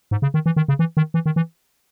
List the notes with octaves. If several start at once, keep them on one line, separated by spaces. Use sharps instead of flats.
G#2
C#3
D#3
E3
D#3
C#3
E3
D#3
E3
D#3
E3